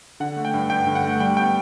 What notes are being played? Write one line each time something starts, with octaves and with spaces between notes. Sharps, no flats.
D3 F#5
A3
G5
G2
G2 G5
D3
F#5
A3
G3 G5
B3 G5